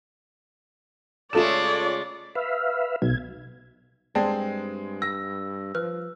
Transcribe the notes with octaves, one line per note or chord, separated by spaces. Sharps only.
C#3 G#3 A3 F4 A4 C#5 D5 E7
B4 E5 F5
B1 G#6
G2 G#3 C4 G#4 D5 G5 A5
E6 A#6
F3 B4 F6